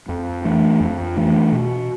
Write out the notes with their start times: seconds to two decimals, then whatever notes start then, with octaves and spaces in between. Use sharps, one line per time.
0.09 F2
0.45 E3 A3 D4
0.81 F2
1.16 E3 A3 D4
1.52 B2